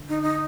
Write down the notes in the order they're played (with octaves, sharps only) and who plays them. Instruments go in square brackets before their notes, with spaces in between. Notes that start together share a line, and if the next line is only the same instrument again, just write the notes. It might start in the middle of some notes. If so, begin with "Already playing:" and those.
Already playing: [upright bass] D3
[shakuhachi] D#4
D#4